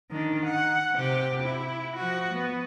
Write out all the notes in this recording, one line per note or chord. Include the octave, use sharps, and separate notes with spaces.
D#3 D4
F#5
C3 G4
E4
F3 F#4
B3